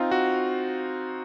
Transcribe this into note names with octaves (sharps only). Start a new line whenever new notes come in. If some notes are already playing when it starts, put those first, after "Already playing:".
Already playing: C4 D#4 F4
F#4